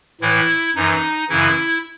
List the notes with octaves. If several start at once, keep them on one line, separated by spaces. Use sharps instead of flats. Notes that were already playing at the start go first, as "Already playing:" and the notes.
A2 E3 E4
F#2 E3 D#4
F#2 C#3 E3 E4